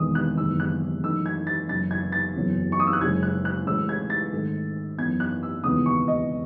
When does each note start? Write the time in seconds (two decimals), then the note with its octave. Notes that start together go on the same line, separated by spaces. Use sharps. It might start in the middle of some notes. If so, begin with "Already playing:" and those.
Already playing: E1 E2 D#3 D#6
0.15 F#6
0.37 F#1 E2 D#3 E6
0.60 F#6
1.03 F#2 E3 A3 D#4 E6
1.26 G#6
1.47 A6
1.69 F#1 F#2 E3 A6
1.91 G#6
2.12 A6
2.35 F#1 E2 C#3 F#3 C#4
2.72 C#6
2.80 D#6
2.87 E6
2.93 F#6
3.01 F#1 F#2 C#3 G#3 G#6
3.23 F#6
3.45 F#6
3.67 A1 A2 G#3 C#4 E6
3.89 G#6
4.10 A6
4.32 G#2 D#3 A3
4.98 F#2 E3 B3 G#6
5.20 F#6
5.43 E6
5.64 E1 D#2 C#3 E3 B3 D#6
5.86 C#6
6.08 D#5